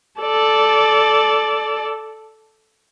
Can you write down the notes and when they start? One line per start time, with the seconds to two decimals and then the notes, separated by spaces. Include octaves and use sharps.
0.21 A4 D5